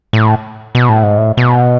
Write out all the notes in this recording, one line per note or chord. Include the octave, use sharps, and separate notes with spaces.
A2
B2
A2
G#2
A2
B2